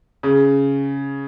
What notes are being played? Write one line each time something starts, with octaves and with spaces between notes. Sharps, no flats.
C#3